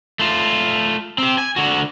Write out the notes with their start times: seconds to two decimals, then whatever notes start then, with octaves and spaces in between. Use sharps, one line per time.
0.19 A3 F4
1.18 C4 G4
1.38 G#5
1.56 D3 F#4